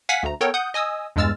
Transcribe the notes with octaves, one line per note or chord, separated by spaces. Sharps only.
F5 F#5 G#5 B6
D2 A3 A#5
B3 A4 A#4 C#5 G5
F#5 D#6 G6
D#5 G#5 D#6 E6
E2 G2 G#3 E6 F6 A6